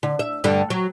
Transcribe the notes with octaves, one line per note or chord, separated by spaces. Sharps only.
D3
E5
G2 D3 G3
F#3